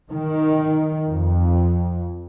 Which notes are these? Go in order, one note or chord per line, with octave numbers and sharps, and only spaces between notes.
D#3
F2